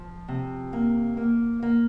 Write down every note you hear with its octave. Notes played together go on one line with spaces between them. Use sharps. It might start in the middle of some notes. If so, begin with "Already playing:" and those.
Already playing: F3
C3
A#3
A#3
A#3